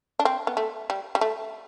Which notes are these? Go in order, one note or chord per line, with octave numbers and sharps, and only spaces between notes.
D4
C4
B3
A3
G3
G3
A3